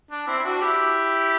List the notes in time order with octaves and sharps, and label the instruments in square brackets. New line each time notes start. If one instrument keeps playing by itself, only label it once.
[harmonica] D4
C4 E4
E4
D4 F#4
E4 G4